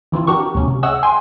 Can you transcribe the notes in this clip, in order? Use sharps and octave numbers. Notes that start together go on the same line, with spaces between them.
D#3 E3 C4 E4 F4
D4 F#4 G4 A#4 C#6
D2 B2 F#3 C#4
C3
G#4 C#5 D#5 E5 F#5 E6
G5 G#5 C6